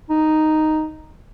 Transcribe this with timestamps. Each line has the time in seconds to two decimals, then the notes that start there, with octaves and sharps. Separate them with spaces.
0.09 D#4